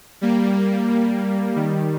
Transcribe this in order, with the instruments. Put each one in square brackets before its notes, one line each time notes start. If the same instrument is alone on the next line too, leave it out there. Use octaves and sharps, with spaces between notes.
[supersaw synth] G3 A#3
D#3 G3